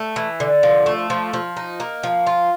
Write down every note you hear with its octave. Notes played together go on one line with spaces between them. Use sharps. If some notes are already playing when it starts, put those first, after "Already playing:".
Already playing: A3
E3
D3
F3
A3
F3
F3
D#4
A#3
F3
F4